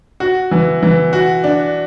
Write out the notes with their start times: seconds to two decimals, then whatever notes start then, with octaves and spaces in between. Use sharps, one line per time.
0.20 F#4
0.51 E3
0.83 E3
1.13 F#4
1.44 D4